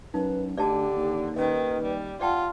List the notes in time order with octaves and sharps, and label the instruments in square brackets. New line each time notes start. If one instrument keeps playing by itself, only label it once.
[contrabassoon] F#2 [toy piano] D#4 [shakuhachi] B4
[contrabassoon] D2 [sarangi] D3 [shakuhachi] G4 [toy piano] D5 D#5 A5
[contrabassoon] D#2
[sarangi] D#3 [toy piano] C#4 D#5 [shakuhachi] B4
[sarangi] G3
[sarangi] F4 [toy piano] D5 G5 A5 [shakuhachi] F#5